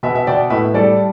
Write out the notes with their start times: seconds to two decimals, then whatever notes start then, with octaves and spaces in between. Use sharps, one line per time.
0.03 B2 B4 E5
0.15 E5
0.27 B2 D5 G5
0.50 A2 B4 E5
0.74 G3 A4 D5